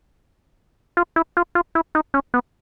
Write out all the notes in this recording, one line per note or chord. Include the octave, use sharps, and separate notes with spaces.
F4
E4
F4
F4
E4
D#4
C#4
B3